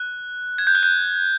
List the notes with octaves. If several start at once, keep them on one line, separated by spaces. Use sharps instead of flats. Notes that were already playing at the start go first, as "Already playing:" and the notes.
Already playing: F#6
G#6
G6
F#6
G6